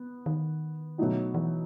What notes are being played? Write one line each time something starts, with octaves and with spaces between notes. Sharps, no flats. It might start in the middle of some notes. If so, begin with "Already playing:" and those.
Already playing: B3
D#3
B2 F#3 A3 D#4 F#4
E3